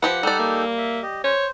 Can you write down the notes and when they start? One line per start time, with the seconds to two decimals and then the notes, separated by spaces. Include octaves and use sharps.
0.03 F3 G4 B4 F#5
0.23 G3 D#4 G4 A4 D5
0.39 A#3
0.78 E5
1.02 G4 D#5
1.24 C5 C#5